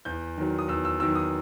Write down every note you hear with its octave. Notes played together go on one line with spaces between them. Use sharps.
E2 G6
D#3 F#3
D#6
E2 E6
E6
D#3 F#3 E6
D#6